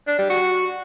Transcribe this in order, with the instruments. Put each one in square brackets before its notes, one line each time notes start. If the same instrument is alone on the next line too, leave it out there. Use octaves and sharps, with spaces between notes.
[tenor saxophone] D4
G3
F#4